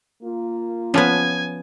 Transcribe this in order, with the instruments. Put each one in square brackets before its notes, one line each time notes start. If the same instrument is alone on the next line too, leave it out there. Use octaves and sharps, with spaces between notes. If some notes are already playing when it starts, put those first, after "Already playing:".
[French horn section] A#3 F4
[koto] F3 B3 [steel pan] C#4 A5 [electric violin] G#5